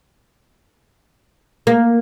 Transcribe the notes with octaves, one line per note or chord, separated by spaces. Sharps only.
A#3